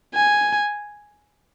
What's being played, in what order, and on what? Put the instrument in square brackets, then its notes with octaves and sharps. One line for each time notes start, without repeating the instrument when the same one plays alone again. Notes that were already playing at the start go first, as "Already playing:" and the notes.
[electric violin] G#5